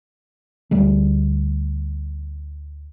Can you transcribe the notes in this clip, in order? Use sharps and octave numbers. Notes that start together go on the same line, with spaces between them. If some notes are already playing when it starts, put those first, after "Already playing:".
D2 G3 A3